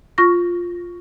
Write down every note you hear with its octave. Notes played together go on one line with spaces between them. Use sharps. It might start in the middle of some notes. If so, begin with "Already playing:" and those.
F4 C#6 A#6